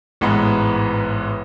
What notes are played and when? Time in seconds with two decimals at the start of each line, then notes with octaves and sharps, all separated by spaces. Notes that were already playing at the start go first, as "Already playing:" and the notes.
0.21 A1 G#2 E3 G#3 B3